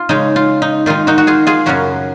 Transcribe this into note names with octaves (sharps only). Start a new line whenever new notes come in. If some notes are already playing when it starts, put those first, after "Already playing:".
Already playing: F4
C#3 G#3 C#4 D#4
F4
D#4
D#3 G#3 D#4 F4
D#4 F#4
F#4
F4 G#4
F4 G#4
F#2 C#3 F#3 C#4 F#4 A#4